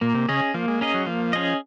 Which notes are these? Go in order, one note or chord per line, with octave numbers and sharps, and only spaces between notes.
A#2 A#3
C3
C#3 C#4 G#4 D#5
F3 A#3
G#3
A#3 C#4 G#4 D#5
F#3
F3 A#3
C#4 G#4 D#5